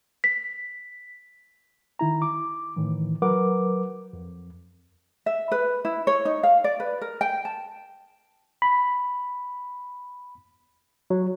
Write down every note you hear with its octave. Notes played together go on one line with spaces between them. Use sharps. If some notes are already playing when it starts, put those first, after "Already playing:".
B6
D#3 E4 A#5
D6
A2 D#3 E3
F#3 A#4 B4 F#5 D6
F2
E5
B4
E4
C#5
D#4
F5
D5
B4
A#4
G5
A5
B5
F#3